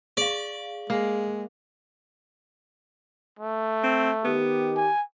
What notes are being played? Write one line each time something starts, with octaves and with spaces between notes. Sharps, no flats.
G#4 D5 F5
G#3 A#3
A3
C4
D#3 B3 G4
G#5